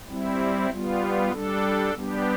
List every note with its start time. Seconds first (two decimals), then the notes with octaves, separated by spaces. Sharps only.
0.08 G3 C4 E4
0.70 G3 B3 F4
1.32 G3 D4 A4
1.94 G3 B3 D4 G4